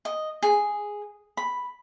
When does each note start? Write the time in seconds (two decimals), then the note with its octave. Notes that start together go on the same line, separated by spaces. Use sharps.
0.05 D#5
0.43 G#4
1.37 B5